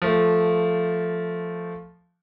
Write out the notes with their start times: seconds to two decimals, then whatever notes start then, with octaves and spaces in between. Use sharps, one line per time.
0.02 F3 A3